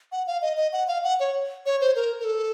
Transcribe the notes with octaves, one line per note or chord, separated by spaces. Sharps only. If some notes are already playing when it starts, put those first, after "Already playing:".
F#5
F5
D#5
D#5
F#5
F5
F#5
C#5
C#5
C5
A#4
A#4
A4